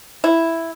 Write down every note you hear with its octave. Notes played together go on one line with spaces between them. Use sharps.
E4